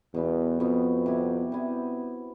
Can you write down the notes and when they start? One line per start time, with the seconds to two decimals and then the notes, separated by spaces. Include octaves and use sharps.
0.14 E2 B2 G3 B3
0.59 F2 B2 G3 B3
1.06 C3 G3 B3 E4
1.52 C3 G3 B3 E4